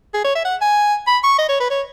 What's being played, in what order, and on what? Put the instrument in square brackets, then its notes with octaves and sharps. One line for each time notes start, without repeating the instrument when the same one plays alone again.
[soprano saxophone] G#4
C#5
E5
F#5
G#5
B5
C#6
D#5
C#5
B4
C#5